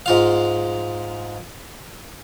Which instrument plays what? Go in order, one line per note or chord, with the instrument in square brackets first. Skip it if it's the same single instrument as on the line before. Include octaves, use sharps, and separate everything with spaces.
[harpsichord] G#2 F4 F5